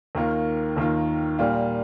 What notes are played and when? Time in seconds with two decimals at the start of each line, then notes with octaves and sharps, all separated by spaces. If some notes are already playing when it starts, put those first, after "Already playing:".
0.15 D#2 D#3 A#3 F4
0.77 D#2 D#3 A#3 F4
1.39 A#2 G3 A#3 F4